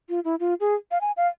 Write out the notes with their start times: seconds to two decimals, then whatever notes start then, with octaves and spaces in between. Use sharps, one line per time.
0.09 F4
0.24 E4
0.40 F4
0.60 G#4
0.91 F5
1.01 G#5
1.17 F5